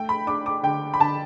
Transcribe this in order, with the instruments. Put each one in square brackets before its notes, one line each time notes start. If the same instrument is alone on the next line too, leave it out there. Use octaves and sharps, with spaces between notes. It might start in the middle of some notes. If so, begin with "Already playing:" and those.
Already playing: [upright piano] A3 G5
B5
D4 D6
D6
D3 G5
B5
D3 A5